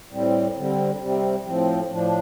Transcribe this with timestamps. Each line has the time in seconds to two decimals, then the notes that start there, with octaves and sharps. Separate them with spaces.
0.11 A2 G3 C4
0.55 D3 G3 C4
1.00 C3 G3 C4
1.44 A2 F3 C4
1.89 A2 F3 D4